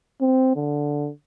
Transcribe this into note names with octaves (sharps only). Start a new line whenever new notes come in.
C4
D3